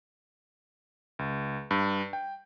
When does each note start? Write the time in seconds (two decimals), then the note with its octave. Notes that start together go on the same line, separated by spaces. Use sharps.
1.19 C#2
1.71 G2
2.13 G5